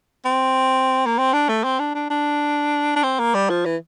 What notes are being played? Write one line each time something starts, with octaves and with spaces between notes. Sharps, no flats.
C4
A#3
C4
D4
A3
C4
D4
D4
D4
D4
C4
A#3
G3
F3
E3